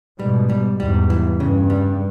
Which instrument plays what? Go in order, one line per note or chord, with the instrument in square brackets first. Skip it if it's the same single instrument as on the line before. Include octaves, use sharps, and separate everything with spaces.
[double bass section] G#2 B2 [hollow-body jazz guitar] G3
[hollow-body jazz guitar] G3
[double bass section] E2 G#2 [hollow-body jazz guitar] G3
[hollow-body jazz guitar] E3
[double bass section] G2 [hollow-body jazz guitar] C#3
[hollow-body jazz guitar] G3